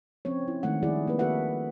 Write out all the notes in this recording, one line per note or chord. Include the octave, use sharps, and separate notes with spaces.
F3 C4 C#4 C#5
E4
D#3 G#3 A3 C4 F#5
D#3 F3 G3 E4 G#4 D5
A#3 C4 B4
D#3 F#4 A4 B4 E5 F#5